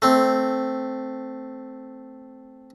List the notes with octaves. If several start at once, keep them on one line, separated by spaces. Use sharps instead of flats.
A3 C4